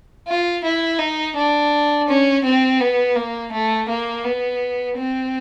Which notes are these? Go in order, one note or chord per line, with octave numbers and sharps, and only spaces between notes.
F4
E4
D#4
D4
C#4
C4
B3
A#3
A3
A#3
B3
C4